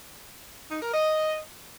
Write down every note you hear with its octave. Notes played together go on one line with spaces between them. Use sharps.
D#4
A#4
D#5